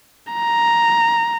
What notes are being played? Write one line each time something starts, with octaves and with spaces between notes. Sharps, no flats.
A#5